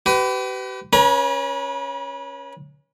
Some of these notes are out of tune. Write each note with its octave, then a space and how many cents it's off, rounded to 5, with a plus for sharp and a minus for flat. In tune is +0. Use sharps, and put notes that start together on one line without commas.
G4 -40 B4 +25
C#4 +0 B4 -35 A#5 +35